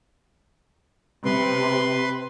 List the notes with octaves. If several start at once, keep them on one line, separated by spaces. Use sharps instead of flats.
C3 B4 C6